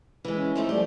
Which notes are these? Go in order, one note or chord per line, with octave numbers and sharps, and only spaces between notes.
E3 G#3
C#4
F3 A3 D#4
F3 G3 A3 G4